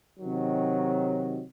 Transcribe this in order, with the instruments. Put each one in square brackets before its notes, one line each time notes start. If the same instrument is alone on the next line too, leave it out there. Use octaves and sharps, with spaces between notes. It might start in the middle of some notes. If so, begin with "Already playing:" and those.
[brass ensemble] C3 D#3 F#3